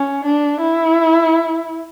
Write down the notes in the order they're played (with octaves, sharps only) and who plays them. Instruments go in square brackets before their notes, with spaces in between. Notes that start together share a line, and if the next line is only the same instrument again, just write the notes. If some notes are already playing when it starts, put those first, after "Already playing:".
Already playing: [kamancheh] C#4
D4
E4